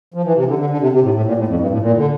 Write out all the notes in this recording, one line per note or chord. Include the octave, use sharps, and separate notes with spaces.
F3
E3
C3
D3
D3
D3
C3
C3
A2
A2
A#2
A2
F2
G2
A2
A#2
D3